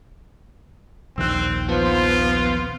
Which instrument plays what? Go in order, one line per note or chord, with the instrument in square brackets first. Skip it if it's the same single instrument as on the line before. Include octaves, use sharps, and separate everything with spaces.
[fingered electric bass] A#1 D#2 D#3 [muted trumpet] C4 [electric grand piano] E6 F#6
[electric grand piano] F3 C5 [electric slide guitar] B3 [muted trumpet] F4